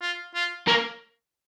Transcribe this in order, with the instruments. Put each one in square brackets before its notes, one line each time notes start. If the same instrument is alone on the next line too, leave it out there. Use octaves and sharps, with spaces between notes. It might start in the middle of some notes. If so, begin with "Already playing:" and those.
[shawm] F4
F4
[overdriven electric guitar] A#3 [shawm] C#4